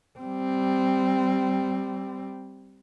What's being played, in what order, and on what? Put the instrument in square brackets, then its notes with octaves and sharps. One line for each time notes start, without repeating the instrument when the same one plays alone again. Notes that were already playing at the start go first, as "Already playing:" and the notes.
[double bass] G3 C4